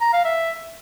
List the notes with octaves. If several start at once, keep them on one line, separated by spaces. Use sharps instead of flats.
A#5
F5
E5